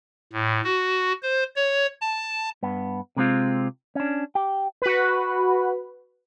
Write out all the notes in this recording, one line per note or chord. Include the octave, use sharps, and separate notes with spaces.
A2
F#4
C5
C#5
A5
G2 B3
C3 G#3 C4 F4
C#4 D4
G4
F#4 B4